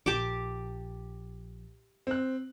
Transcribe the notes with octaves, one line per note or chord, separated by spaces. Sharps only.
A#1 G4 A5 D6
C4 F#6